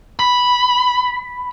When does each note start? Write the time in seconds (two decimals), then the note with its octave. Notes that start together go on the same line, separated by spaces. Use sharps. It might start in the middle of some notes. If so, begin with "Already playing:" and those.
0.19 B5